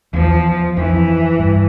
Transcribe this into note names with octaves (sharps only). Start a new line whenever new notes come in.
E2 F3
F2 E3
G2